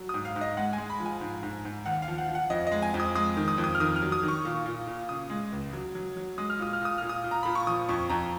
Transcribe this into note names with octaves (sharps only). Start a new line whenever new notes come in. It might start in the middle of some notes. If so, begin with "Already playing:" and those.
Already playing: F#3
G#2 D#6
F5
G#2
D#5
G#3 F#5
G#5
G#3
B5
F3
G#5
G#2
G#2
G#2
D#2 F#5
F5
F3
F#5
F3
F#5
F2 D#5
G#3 D#5
G#5
F2
D#6
G#3 D#6
D#3
D#6
F2
D#6
F6
D#3 D#6
F6
F#3
D#6
D#3
C#6
A#2
A#2
A#2
C#3 D#6
G#3
C#2
F#3
F#3
F#3
G#3 D#6
F6
A#2 D#6
F6
A#2 D#6
A#2 F6
D#6
A#2
A#5
A#2 B5
C#6
F3 D#6
F2 C#6
F2 A#5